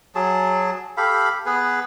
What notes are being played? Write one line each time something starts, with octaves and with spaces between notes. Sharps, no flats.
F#3 G#4 A5
G4 A4 F5 B5
B3 G#4 B4